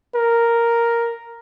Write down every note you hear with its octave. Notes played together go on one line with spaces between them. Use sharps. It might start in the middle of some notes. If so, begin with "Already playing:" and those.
A#4